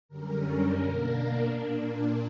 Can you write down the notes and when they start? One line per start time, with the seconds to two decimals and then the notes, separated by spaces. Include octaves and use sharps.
0.08 F#2 D3 G3 C#4 A#4
0.77 B2 A#3 D4
1.45 A#2 A#3 D4